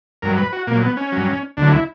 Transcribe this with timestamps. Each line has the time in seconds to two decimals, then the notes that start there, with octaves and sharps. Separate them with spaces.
0.22 G2 F#3 A#4
0.37 B4
0.52 F#4
0.67 A#2 F#3 A#3
0.82 B3
0.97 C#4
1.12 G2 F#3
1.57 D2 D3 F#3 D4
1.69 E4